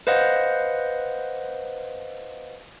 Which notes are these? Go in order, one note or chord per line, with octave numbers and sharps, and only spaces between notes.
B4 C5 D#5 F5 F#5